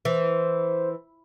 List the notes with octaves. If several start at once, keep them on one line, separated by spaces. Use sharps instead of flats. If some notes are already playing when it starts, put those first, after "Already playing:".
E3 C5